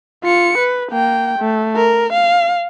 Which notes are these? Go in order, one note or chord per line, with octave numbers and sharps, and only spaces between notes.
F4 C#7
B4
A#3 G5
A3
A#4
F5